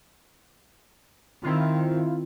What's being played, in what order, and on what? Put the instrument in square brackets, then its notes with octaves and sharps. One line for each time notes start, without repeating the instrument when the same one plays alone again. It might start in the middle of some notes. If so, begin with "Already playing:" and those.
[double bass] D#3 [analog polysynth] C4 E4 F4